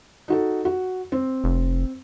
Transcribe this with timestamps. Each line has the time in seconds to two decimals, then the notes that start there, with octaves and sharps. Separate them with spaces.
0.28 D#4 F#4 A4
0.65 F#4
1.12 C4
1.44 F1